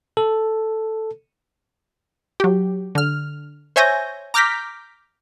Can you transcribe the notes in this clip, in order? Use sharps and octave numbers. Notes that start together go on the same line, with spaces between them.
A4
F#3 G4
D3 F6
C5 C#5 E5 G#5 G6 A#6
A#5 D6 F6 G6 A#6 B6